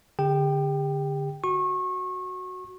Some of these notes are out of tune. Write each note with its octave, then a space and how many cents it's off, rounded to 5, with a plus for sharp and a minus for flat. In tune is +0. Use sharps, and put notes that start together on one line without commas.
D3 -10 G4 +40 G5 +0
F#4 +0 C#6 -30